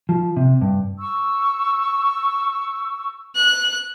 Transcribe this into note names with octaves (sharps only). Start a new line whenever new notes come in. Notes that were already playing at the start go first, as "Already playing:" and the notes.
F3
C3
G2
C#6 E6
F#6